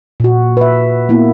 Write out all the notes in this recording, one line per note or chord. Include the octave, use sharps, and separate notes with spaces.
A#2 F#4
B4 E5
A#3 B3 E4